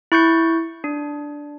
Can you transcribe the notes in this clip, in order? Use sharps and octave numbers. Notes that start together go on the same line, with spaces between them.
E4 C#6 G6 C#7
D4